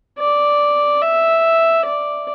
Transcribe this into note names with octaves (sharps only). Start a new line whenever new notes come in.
D5
E5
D5